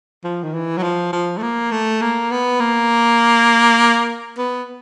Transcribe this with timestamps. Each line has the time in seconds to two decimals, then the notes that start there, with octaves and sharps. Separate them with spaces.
0.24 F3
0.43 D#3
0.54 E3
0.77 F#3
0.83 F3
1.13 F3
1.38 A3
1.42 A#3
1.71 A3
2.01 A#3
2.31 B3
2.60 A#3
4.38 B3